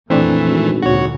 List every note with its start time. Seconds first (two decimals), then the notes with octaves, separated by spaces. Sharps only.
0.10 F2 A#2 E3 A3 C4 D4
0.46 G#1
0.82 D2 A#2 C#3 F#4 C#5